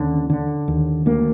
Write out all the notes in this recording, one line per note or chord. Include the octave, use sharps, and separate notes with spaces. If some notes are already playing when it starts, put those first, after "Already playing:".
Already playing: D#2 D3 C#4
D3
D#2
D2 A#3